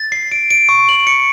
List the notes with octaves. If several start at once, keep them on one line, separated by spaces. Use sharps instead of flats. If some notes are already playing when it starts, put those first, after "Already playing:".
Already playing: A6
C7
D7
D7
C#6
F#7
C#7